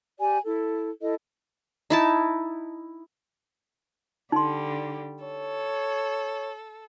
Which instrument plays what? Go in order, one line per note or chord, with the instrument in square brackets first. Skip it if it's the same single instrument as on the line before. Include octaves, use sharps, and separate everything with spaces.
[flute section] G4 D5 G#5
E4 A4
E4 A4 D#5
[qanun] D#4 E4 A5
[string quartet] D3 G3 [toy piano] D#4 C6
[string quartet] A4 [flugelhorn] C#5